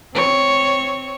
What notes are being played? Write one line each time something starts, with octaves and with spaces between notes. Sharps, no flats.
C4 C#5